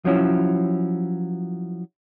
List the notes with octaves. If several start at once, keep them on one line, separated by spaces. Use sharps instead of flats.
F3 F#3 C#4 E4